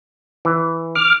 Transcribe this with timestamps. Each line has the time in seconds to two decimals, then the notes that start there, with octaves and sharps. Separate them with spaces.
0.45 E3
0.95 D6 F6